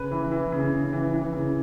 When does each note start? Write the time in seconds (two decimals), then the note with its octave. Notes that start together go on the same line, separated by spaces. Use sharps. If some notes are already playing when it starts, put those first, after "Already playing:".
Already playing: C#3 B4
0.11 E3
0.31 E3
0.52 C#3
0.72 C#3
0.92 E3
1.13 E3
1.33 C#3